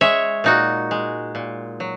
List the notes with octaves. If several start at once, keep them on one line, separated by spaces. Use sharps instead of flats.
G#3 C#5 E5
A#2 D#4 F#4
G#3
A#2
F#3